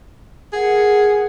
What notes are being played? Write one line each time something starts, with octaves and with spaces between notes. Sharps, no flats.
G#4 A#4 F#5